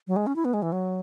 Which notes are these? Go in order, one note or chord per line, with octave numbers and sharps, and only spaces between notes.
F#3
G#3
C#4
E4
B3
G#3
E3
F#3